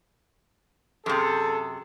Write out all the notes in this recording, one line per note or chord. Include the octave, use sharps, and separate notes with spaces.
F#2 C3 G#4 A4